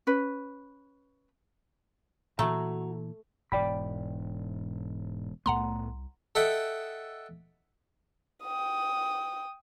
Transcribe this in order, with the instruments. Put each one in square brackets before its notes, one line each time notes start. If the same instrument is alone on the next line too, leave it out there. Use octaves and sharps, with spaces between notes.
[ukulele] C#4 B4
[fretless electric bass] A#2 E3 [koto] A3 [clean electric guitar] F#4 A#5
[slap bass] E1 [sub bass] G#2 [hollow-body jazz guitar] D5 G5 B5
[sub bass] C2 [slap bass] A2 A3 B3 [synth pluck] F#5 A#5 C6
[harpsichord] A4 D#5 E5 F#5 G5
[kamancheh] G5 D#6